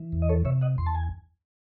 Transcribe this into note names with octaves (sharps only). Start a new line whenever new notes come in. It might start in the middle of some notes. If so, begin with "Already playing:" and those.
Already playing: E3
E2
D#5
A4 C#5
C3 C#5 E5
D#5 F#5
E2 C6
A5
G#5